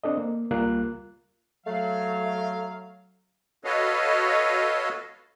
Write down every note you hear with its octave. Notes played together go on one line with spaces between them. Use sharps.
C4 D4 A4 D#5
A#3
C#2 G3 A#3 F4 F#6
F#3 A3 F5
F#4 A4 B4 C#5 D#5 F5